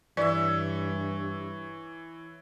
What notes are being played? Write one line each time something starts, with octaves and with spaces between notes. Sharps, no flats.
G2 E3 C#5 D5 E5